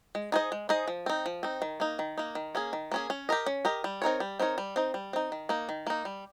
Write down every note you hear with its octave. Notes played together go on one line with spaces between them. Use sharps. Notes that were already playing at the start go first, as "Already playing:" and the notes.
G#3
D#4 G#4 C5 D#5
G#3
D#4 G#4 C5 D#5
F3
C4 D#4
F3
C4 D#4
D#3
A#3 D#4
D#3
A#3 D#4
D#3
A#3 C#4 G#4
D#3
A#3 C#4 G#4
C#4
G4 A#4 D#5
C#4
G4 A#4 D#5
G3
C4 D#4 A#4 C#5
G3
C4 D#4 A#4 C#5
G3
C4 D#4
G3
C4 D#4
D#3
A#3 D#4
D#3
A#3 D#4
G3